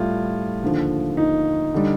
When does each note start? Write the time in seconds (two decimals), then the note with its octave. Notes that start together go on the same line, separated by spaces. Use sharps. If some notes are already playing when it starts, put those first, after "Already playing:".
Already playing: A2 G3 F4
0.63 D#2 D3 F3
1.17 D#4
1.74 D3 G3